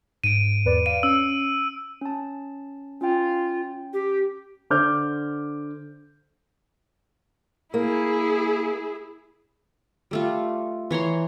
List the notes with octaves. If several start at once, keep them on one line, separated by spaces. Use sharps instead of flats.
G#2 D7 D#7
E2 B4 D5
F5 D#7
C#4 E6
C#4 A5
C#4 F4 G5
G4
D3 C5 D6 F6 G6
A#3 E4 G#4
G3 A3 F4
E3 C#5 A#5 C6